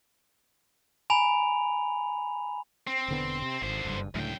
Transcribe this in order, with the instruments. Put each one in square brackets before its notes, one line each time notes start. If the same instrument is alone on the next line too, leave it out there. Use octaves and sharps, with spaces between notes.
[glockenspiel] G#5 A#5 B5 F7
[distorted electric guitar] C4
[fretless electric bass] E1 D3 B3
C3
[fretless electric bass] G#1 [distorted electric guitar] D3 C5
[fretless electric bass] F#1 G2
[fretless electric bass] C#2 A2 D3 [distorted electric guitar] F#2 G5